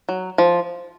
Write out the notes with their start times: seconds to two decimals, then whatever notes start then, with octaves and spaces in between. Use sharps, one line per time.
0.09 F#3
0.38 F3